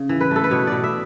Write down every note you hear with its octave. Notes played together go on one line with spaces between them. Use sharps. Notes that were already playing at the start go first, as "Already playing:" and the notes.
Already playing: C#3
E3
B4
A3 A4
B4
B2 C#5
B2 D5
E5